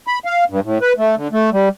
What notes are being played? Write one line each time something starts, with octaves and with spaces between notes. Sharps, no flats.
B5
F5
G2
A2
B4
A3
D3
A3
G3